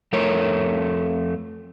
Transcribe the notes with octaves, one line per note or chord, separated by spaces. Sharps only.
F2 A3 A#4 C#5